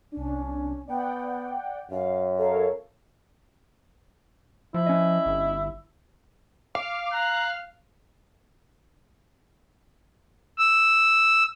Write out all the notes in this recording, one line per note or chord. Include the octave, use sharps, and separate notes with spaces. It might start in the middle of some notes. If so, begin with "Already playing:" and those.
C2 C#4 D4
B3 D5 F#5 G5
F#2 F5
A4 A#4 C#5 F5
F3 E4
C#4 D#5
G1
F5 D6
A#5 F#6
E6